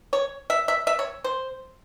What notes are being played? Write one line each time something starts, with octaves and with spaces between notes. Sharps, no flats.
C#5
E5
E5
E5
C#5
C5